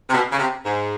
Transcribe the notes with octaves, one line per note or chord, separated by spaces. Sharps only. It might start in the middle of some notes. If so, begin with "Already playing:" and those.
C3
B2
C#3
C3
G#2